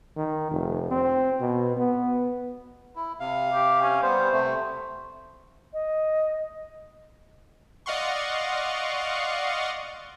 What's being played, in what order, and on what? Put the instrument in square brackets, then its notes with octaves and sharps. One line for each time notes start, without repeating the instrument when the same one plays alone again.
[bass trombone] D#3
F1
C4
B2
B3
[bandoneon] E4
C3 F5
[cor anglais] G4
C#4
[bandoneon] G3 B3 [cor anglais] C5
[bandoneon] C3 A3
[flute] D#5
[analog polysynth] D5 D#5 F5 F#5 C6 C#6